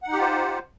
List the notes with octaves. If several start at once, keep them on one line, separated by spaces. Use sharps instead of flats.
D#4 F4 G4 C5 F#5